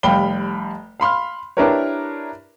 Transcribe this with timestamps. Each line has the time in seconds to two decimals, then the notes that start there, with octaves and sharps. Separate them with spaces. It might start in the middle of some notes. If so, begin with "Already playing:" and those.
0.03 F1 G3 F5 G5 B5 G7
1.00 F5 B5 C6 F6
1.57 D4 E4 G4 A#4 B4 C#5